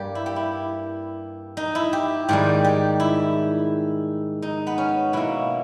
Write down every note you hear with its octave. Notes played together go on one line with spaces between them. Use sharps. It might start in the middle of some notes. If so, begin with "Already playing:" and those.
Already playing: G2 G3 A#3 G4
E4
G4
E4
D#4
E4
G4
G#2 D#3 G3 G4
G4
E4
D#4
B3
C#4
B2 A#3 E4